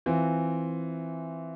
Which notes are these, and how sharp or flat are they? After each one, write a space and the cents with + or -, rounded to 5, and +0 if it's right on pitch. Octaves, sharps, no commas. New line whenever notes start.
E3 +0 C4 +0 F4 +0